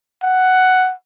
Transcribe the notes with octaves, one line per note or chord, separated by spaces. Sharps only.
F#5